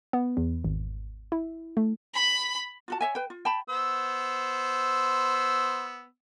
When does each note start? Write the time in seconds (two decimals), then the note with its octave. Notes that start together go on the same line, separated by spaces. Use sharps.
0.13 B3
0.37 E2
0.64 G#1
1.32 E4
1.77 A3
2.14 B5
2.88 F4 F#4 A5
3.01 C#5 E5 G#5
3.15 B4 G5
3.30 F4
3.45 G5 A5 B5
3.69 B3 C5 E6